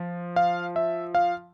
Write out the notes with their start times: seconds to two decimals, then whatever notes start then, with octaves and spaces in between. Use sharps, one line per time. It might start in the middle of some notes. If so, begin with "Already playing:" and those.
Already playing: F3
0.36 F5
0.76 E5
1.15 F5